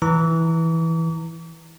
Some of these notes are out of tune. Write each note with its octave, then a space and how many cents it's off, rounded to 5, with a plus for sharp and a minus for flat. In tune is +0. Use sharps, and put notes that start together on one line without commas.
E3 -10 A#5 -30 D6 -45